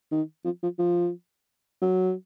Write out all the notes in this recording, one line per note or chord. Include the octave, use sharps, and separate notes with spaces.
D#3
F3
F3
F3
F#3